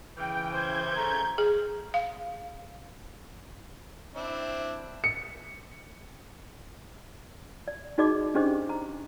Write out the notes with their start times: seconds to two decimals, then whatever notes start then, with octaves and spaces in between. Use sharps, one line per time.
0.17 C#3 E3 G5
0.52 C5 G6 G#6
0.96 C#3 E3 A3 A#5
1.38 G#4
1.94 F5
4.15 C4 D4 E4
5.04 C#7
7.68 D5
7.98 D#4 F#4 G#4 D5 D#5 D6
8.35 C#4 D4 G4 G#4 C5 D#5
8.69 A#5